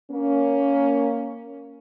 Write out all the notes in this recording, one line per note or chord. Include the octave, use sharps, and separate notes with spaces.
A#3 C#4